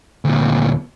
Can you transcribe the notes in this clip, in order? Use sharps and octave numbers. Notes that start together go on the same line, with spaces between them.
D2 A#2